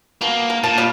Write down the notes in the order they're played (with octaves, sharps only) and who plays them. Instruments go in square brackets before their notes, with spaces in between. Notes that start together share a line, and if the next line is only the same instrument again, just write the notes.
[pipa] B2 [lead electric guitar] A#3
[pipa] A#4
[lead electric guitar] A#2 [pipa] A5
[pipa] G3 F4 F5